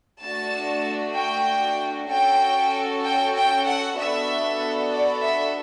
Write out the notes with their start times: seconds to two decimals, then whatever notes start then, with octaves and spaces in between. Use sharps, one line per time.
0.21 A3 D4 F#4 A5
1.16 G5
2.09 C#4 F#4 A4 G5
3.04 G5
3.36 G5
3.67 F#5
3.98 B3 D4 F#4 A4 E5
4.93 D5
5.24 E5